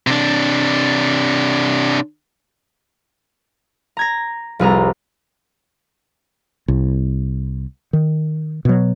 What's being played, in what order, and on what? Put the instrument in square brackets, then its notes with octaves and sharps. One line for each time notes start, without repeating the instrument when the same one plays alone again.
[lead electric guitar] C3 D4
[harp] A#5 G#6 A#6
F1 C2 G#4 A#5
[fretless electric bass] C2
D#3
B2 F#3